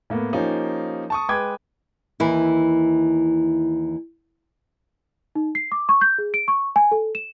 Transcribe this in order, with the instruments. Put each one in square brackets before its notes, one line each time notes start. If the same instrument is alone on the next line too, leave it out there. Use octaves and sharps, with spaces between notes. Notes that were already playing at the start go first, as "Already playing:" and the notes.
[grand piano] A2 A#3 B3
F3 A#3 C#4 D#4 G4
A5 C#6 D#6
G#3 B4 G5 D6 G#6
[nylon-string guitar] D#2 E3 E4
[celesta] D#4
C7
D6
C#6
G6
G#4
D7
C#6
G#5
A4
E7